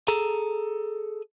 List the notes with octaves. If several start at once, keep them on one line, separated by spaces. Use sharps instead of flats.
G#4 A4 A#5